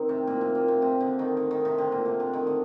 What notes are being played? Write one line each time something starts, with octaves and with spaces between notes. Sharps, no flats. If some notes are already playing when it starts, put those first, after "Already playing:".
Already playing: D#3 C4
C3
A#2
C3
A#2
C3
C3
D3
D#3
D3
D#3
C3
D3
A#2
C3
D3
D#3
D3